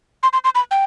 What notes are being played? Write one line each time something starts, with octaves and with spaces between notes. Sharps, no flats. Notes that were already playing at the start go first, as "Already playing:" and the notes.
C6
C6
C6
B5
G5